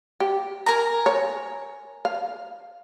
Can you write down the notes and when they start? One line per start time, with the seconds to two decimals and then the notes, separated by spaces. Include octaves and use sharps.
0.20 G4
0.66 A#4 G#5 A#5
1.06 C#5
2.05 F5